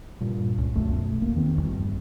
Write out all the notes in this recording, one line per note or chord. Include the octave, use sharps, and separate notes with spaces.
G2 A#2
C#2
A#1 F#2 B2 A3
E1 A#3
E2 D#3 C4
A#1 E2 G2